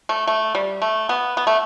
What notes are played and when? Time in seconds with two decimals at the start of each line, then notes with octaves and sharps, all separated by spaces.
0.09 A3
0.27 A3
0.55 G3
0.82 A3
1.09 B3
1.37 B3
1.47 A3